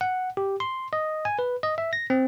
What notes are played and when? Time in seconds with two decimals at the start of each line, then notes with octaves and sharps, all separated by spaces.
0.01 F#5
0.37 G4
0.60 C6
0.93 D#5
1.25 G#5
1.39 B4
1.63 D#5
1.78 E5
1.93 A#6
2.10 C4